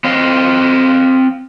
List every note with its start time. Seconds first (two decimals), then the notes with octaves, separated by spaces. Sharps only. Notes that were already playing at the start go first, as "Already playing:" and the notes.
0.04 C4 D#5 F5